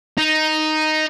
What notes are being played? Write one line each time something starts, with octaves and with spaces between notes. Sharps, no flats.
D#4